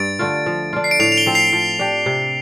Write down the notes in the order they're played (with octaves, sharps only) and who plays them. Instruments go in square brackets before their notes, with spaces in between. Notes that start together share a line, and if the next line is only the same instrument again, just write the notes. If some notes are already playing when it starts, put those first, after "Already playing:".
Already playing: [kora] G2 [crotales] A6 D7
[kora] D3 A3 F4
F3
D4 F4
[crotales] C7
D7
[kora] A2 [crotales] C7 F7
[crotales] F7
D7 G7
[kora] F3 C4
[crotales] C7 F7
[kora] F3
D4 G4
C3